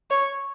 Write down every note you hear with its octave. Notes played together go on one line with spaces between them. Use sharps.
C#5